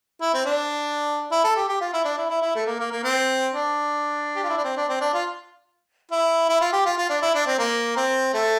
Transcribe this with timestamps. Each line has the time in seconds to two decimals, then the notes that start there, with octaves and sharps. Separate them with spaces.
0.21 E4
0.34 C4
0.45 D4
1.31 E4
1.44 A4
1.56 G4
1.69 G4
1.81 F4
1.93 E4
2.05 D4
2.18 E4
2.30 E4
2.42 E4
2.55 A3
2.66 A#3
2.79 A#3
2.92 A#3
3.04 C4
3.53 D4
4.36 G4
4.43 F4
4.49 E4
4.57 D4
4.64 C4
4.76 D4
4.88 C4
5.01 D4
5.13 F4
6.11 E4
6.49 E4
6.61 F4
6.73 G4
6.85 F4
6.98 F4
7.10 D4
7.22 E4
7.34 D4
7.47 C4
7.58 A#3
7.96 C4
8.33 A3